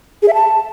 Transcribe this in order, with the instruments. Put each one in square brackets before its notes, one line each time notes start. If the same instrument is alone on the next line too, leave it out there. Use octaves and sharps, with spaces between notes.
[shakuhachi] G#4
E5
A5